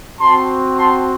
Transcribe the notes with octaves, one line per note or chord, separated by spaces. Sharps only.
C4 F#4 A5 C6
A5 C6